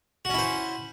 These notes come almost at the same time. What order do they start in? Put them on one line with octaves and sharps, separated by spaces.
F#4 C#4 E4 C5